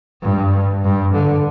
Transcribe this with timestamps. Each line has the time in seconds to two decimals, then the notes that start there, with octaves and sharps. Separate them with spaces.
0.22 G2
0.83 G2
1.14 D3